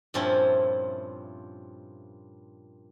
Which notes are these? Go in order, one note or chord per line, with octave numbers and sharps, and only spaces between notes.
G2 A#2 F3 C4 C#4 E4